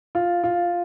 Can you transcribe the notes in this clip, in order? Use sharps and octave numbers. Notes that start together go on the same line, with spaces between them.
F4
F4